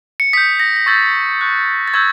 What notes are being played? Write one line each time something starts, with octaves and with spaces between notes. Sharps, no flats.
C#7
D#6 G6 B6
A#6
A#6
C#6 E6 G6 A6
C#6 F#6
A6
C#6 E6 G6 G#6